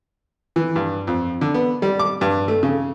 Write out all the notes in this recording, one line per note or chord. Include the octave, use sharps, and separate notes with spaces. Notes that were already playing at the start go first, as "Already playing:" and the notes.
E3
G2
F2
D3
B3
G3
D6
G2
A3
C#3